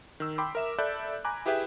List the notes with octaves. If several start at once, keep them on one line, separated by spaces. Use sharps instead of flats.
D#3 E6
G5 B5 C6 D6
A#4 E5 E7
A4 D5 E5 B5 F#6 G6
G#5 A#5 B5 D6 F#6
E4 G4 G#4 B4 E5 G5